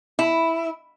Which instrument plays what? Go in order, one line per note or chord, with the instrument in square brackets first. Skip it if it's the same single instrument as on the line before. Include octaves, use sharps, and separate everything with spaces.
[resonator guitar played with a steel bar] E4